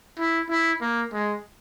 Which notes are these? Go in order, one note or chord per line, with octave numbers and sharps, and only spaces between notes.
E4
E4
A#3
G#3